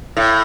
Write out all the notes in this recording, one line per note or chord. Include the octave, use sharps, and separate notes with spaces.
A2